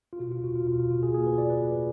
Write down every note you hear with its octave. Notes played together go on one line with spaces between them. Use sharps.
F4
B2 F#4
F4
B2 F#4
F4
B2 F4
F4
B2 F#4
G#4
A#3 G#4
B4
F4 D5
B4
F4